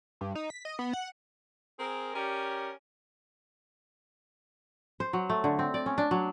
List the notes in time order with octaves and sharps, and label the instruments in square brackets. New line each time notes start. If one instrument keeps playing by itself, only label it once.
[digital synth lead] G2
D#4
B6
D#5
B3
F#5
[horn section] C4 G#4 A#4
C#4 G4 A#4 C#5 D5
[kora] C5
F#3
A3
D3
C4
D5
C#4
D4
F#3